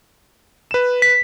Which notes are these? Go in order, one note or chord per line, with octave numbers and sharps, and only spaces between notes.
B4 E7
B6